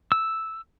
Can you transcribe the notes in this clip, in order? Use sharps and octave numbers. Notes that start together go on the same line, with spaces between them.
E6